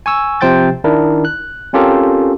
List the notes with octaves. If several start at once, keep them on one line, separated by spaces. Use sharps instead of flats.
G#5 C#6 E6
C3 F3 C5 G5 G6 A6
D#3 D4 E4 A#4
F#6
C4 C#4 F4 G4 A4 A#4